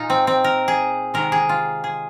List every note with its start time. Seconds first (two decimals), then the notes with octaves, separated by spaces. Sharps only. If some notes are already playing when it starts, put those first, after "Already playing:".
Already playing: A#2 G#3 D#4 F4
0.10 C4
0.27 C4
0.44 A#4
0.68 G#4
1.14 C3 D#3 G#3 A#4
1.32 G#4
1.49 F4
1.84 G#4